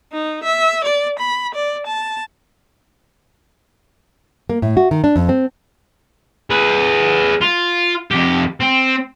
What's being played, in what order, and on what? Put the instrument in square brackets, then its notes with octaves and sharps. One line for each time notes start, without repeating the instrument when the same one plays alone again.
[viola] D#4
E5
D5
B5
D5
A5
[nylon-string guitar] A#3
A2
F#4
D#3
D4
F2
C4
[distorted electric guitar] G#4 B4
F4
F2 G4
C4